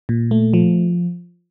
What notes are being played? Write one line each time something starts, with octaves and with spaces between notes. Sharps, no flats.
A#2
A3
F3